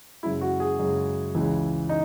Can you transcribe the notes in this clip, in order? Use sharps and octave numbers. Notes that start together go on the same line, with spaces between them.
F#2 C#3 G#3 E4
F#4
G#4
F#2 C#3 G#3
C#2 C#3 E3 G#3
D#4